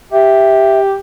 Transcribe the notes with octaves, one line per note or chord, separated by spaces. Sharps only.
G4 E5